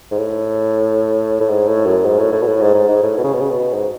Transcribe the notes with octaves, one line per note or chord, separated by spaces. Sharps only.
G#2
A2
A2
G#2
A2
F#2
G#2
A2
A2
B2
A2
G#2
G#2
G#2
A2
B2
C#3
B2
C#3
B2
G#2